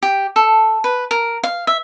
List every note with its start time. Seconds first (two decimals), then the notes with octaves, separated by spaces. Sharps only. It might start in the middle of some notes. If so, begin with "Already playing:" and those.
0.02 G4
0.36 A4
0.84 B4
1.11 A#4
1.43 F5
1.67 E5